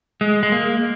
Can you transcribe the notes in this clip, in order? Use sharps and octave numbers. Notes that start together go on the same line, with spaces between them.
G#3
G#3
A#3